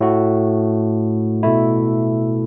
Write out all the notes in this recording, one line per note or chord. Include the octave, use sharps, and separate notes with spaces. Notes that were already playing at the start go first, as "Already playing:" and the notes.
A2 A3 F#4
B2 A3 E4